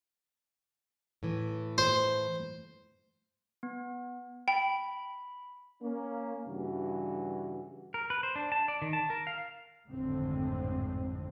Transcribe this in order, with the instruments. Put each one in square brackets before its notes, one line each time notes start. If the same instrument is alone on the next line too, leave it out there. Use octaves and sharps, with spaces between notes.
[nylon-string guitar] A2 E3
[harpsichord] C5
[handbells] B3
[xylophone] G5 [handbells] B5
[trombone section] A#3 C#4
G2 C#3 E3 F#4
[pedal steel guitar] A#4
B4
C5
D4
A5
D5
D#3
A5
A#4
F5
[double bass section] G#1 F2 A2 D3 C4